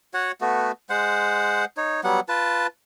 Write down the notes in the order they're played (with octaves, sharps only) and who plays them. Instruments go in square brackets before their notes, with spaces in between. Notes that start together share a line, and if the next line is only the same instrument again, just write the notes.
[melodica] F#4 C#5 F#5
A3 B3 F#4
G#3 C5 F#5
D#4 C#5
F#3 G3 B3 F#5
F4 B4 A5